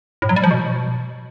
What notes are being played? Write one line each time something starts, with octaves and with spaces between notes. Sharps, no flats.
A2
F#3
G3
F3
B2